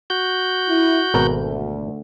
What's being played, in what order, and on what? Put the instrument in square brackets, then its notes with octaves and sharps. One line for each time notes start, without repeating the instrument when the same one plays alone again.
[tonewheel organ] F#4 G6
[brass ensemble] E4
[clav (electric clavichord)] G#1 B2 A#4 [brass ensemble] D2